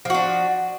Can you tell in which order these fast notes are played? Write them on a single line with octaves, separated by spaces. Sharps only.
F3 F#4 D4